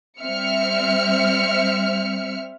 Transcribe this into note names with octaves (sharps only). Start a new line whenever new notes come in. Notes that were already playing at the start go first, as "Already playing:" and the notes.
G3 C4 E5 F6 C#7